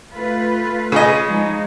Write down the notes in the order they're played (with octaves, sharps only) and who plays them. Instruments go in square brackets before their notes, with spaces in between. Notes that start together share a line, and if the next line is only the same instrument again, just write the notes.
[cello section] A3 F4 B4
[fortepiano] C#3 G#4 D#5
[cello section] F3 G#3 D#4